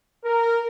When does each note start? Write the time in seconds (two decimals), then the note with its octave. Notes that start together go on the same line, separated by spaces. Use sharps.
0.25 A#4